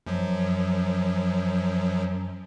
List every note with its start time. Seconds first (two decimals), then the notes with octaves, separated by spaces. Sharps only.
0.06 F#2 F3 F#3